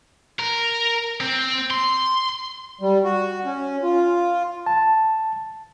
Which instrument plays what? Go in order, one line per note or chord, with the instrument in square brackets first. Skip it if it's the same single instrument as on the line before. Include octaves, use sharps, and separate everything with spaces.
[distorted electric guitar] A#4
C4
C6
[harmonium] G3
F#4
C#4
F4
[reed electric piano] A5